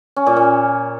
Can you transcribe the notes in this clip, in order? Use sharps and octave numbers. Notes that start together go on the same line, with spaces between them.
C#4
A#2
A#2